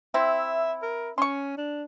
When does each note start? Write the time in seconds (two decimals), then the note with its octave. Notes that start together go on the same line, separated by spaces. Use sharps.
0.14 C4 E4 E5
0.83 A#4
1.18 C#4 C6 C#6
1.57 D4